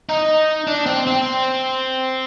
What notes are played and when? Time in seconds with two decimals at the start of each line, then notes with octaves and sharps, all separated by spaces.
0.09 D#4
0.67 D4
0.86 C4
1.07 C4